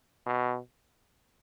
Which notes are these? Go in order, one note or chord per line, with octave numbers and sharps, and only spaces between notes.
B2